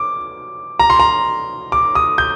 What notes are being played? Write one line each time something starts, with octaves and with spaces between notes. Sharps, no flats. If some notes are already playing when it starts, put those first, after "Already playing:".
Already playing: D6
A#5
C6
A#5
D6
D#6
G6